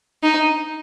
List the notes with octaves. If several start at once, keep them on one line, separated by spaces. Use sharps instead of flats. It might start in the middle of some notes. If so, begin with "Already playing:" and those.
D#4